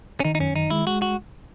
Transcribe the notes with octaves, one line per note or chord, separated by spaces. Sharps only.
C#4
D#3 D#4
D#4
F#2 C#4
D#3 D#4
G#3 E4
G#3 F#4
F#4